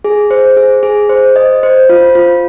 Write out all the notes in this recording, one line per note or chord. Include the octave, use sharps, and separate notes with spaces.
G#4
C5
G#4
G#4
C5
D#5
C5
F4
F4